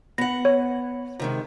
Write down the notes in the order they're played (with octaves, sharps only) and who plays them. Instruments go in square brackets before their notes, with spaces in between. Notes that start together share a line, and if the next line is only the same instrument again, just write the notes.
[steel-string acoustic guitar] B3 F#5 [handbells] A#6
[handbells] C#5
[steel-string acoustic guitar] C3 D#3 G#3